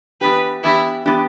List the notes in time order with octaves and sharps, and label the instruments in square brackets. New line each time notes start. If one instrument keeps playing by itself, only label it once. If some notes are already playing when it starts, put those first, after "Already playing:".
[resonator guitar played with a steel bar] E3 B3 D4 G4 [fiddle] B4
[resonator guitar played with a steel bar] E3 B3 D4 G4 [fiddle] E4
[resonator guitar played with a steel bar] E3 B3 D4 G4